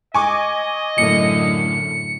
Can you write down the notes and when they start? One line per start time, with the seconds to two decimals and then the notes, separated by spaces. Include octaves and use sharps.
0.14 D#5 G#5 C#6 D6
0.98 F#2 A2 D3 C#7